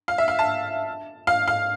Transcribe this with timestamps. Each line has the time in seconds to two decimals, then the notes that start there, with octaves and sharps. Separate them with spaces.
0.08 F5
0.18 E5
0.28 F5
0.39 A5
1.27 F5
1.48 F5